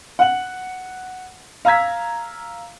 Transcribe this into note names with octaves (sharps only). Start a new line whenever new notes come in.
F#5 F#7
F5 A#5 E6 G#6 B6